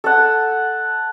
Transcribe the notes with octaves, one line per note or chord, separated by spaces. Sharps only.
A4 F#5